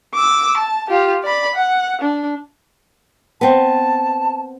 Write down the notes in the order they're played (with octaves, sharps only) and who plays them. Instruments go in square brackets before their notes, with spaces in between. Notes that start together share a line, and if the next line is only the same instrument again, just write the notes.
[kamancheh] D6 E6
A5
F4 G4
D5 B5
F#5
D4
[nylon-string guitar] B3 C4 [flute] A5